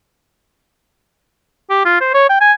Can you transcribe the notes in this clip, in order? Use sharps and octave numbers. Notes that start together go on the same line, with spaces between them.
G4
F4
C5
C#5
G5
G#5